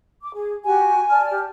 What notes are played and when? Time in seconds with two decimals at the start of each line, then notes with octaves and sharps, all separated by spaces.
0.22 D6
0.35 G#4
0.65 F#4 G4 G#5
1.10 D5 A5 F6
1.31 G4